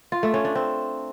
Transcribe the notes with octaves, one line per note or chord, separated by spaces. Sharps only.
F4
A3
C#4
D4
C4